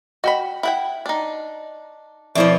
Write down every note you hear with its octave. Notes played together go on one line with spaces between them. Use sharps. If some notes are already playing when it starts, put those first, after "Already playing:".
F#4 D#5 G5 B5
E4 F#5 G5
D4 D#4
F2 B2 F3 E4 D5 E5